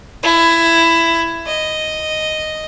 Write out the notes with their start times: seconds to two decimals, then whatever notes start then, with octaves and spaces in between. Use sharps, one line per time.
0.23 E4
1.46 D#5